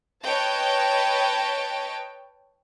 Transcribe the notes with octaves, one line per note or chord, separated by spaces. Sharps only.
B4 C#5 D#5 G5 A5